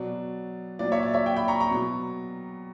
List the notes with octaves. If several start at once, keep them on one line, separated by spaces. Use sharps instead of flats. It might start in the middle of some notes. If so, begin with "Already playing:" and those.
Already playing: B2 F#3 D5
A#2 F#3 D5
C#5 E5
D5
C#5 E5
E5 G5
G5 B5
A#5 C#6
A#5 C#6
B2 F#3